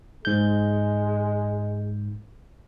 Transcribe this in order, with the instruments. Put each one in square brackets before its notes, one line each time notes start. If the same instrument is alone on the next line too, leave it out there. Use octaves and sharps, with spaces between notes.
[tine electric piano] G#2 G6 [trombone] G#3